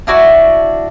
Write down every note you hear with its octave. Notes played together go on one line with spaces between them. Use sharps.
D4 E4 F#4 D5